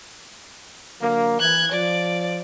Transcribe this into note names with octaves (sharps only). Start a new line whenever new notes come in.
D3 F#3 A#3
E3 F#6 G#6
F3 D5